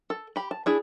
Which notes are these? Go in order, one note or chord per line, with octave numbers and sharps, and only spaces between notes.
A4
G4 B5
A5
D4 E4 G#4